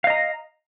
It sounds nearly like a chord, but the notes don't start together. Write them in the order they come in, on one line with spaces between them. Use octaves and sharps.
F5 D#5 A#5